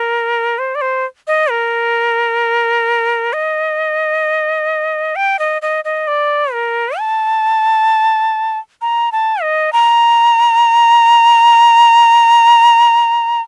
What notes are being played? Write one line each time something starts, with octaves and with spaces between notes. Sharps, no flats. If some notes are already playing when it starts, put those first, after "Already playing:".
Already playing: A#4
C5
D5
C5
D#5
A#4
D#5
G5
D#5
D#5
D#5
D5
A#4
A5
A#5
A5
D#5
A#5